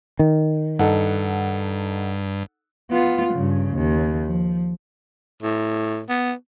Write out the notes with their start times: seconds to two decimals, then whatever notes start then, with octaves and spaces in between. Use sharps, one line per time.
0.19 D#3
0.79 G2 D#4 A4 F#5
2.91 B3 F4
3.34 G2 C#3
3.76 D#2
4.24 F3
5.43 A2
6.09 B3